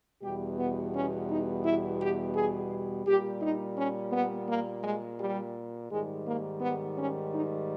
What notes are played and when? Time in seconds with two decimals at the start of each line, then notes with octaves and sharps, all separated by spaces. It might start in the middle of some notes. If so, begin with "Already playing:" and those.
0.22 E2 B2 G3 G4
0.58 B3
0.94 C#4
1.29 D#4
1.64 E4
2.00 G4
2.35 G#4
3.06 A#2 G3 G4
3.41 D#4
3.77 C#4
4.12 B3
4.48 A#3
4.83 G#3
5.19 G3
5.90 G#2 D#3 G3 G#3
6.26 A#3
6.61 B3
6.97 C#4
7.32 D#4